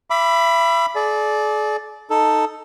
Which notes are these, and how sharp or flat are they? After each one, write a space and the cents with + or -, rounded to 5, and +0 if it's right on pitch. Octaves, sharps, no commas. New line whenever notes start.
E5 +35 B5 +0 D6 +0
G#4 +45 D5 +0
D#4 +0 A4 +5